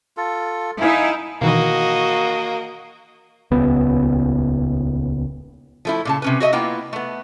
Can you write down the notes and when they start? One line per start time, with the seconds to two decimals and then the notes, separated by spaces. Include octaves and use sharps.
0.17 F4 A4
0.81 D#4 E4 F5 G#5
1.42 B2 D#3 E3 A#3 F#4 D#5
3.51 D#1 C#2 B3
5.85 F3 A3 E4
6.05 A#2 C#3 A5
6.22 C3 C#4 B4
6.40 F#4 C#5 D#5 E5
6.52 A#3 B3 E4 F4 G5
6.93 A3 B3